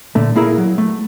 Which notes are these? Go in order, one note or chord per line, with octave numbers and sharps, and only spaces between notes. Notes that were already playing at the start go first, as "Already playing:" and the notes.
A#2 D3 A3
A#3 E4 G#4 A#4 E5
F#3
A3